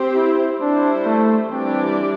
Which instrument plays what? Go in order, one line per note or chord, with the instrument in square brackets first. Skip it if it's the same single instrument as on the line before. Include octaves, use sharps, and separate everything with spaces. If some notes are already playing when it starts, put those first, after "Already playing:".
Already playing: [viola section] C4 G4 C5
[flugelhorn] E4
[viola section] G3 E4 C5 [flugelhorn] D4
[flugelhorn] A3
[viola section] E3 G3 D4 G4 D5 [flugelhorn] C4